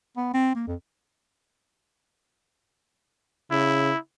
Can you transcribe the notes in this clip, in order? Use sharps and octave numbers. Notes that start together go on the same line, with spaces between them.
B3
C4
A#3
F2
C#3 E4